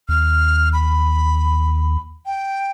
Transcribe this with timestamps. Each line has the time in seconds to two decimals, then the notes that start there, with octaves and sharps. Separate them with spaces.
0.09 D#2 F6
0.73 B5
2.26 G5